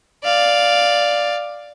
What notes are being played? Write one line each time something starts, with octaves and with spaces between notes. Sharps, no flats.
D5 F5